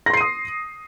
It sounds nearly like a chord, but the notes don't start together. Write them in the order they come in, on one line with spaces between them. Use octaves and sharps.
A#6 C6 C7 D#7 D#6